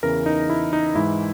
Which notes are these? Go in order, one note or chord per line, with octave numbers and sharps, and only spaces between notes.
E2 C#3 E3 A#4
D#4
E4
D#4
G#2 E3 G#3 E4